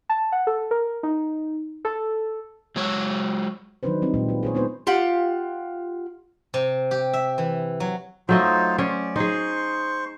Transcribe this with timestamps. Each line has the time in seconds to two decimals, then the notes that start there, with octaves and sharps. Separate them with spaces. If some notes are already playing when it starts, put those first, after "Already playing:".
0.09 A5
0.32 F#5
0.47 A4
0.71 A#4
1.03 D#4
1.85 A4
2.76 F#3 G#3 C#5
3.83 D#3 F#3 D4 D#4 B4 C5
4.02 G3 C4 D#4
4.14 A#2 G3 G#3 A#3
4.29 F4 B4
4.43 G#4 C5 C#5
4.54 G#3 B3 D4 D#4 B4 C5
4.87 F4 G4 F#5
6.54 C3
6.91 G4
7.13 E5
7.38 E3
7.80 F#3
8.29 F#3 A3 D#4 F4 C5 D#5
8.78 C#4 C5 D5
9.16 D#4 G#4 C5 C6 C#6